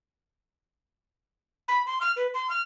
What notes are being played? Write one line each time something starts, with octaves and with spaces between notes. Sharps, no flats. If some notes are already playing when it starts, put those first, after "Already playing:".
B5
C6
F6
B4
C6
F6